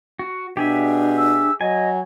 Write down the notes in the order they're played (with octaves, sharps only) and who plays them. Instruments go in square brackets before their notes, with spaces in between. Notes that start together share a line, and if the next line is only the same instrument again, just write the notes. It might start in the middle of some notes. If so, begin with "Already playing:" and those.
[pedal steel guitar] F#4
[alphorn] B2 [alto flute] D4 [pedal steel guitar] G4 G#4 E5
[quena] E6
[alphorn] F#3 [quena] D#5 [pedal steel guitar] G#5